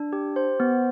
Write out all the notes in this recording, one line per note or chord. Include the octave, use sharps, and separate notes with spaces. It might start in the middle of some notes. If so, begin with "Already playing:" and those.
Already playing: D4
G4
C5
B3